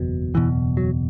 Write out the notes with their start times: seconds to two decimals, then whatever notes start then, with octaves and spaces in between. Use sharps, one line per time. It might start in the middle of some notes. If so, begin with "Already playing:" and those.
Already playing: F#1 E2 B2
0.34 F#1 E2 B2 E3
0.77 F#3